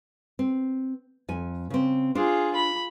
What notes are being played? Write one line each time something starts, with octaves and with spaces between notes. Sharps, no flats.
C4
F2 G#5
C#3 C4
D4 F4 G#4 C5
B5